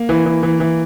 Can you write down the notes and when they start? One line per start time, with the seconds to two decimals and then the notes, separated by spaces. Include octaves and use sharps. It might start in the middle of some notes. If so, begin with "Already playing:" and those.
Already playing: A#3
0.09 E3
0.26 E3
0.43 E3
0.60 E3